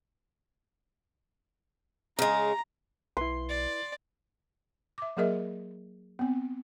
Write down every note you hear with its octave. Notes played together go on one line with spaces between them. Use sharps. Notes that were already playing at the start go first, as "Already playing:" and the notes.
C#3 G#3 A#5
B1 E4 B4 C6
D5
E5 D6
F#3 A#3 G#4 A#4 D#5 E5
B3 C4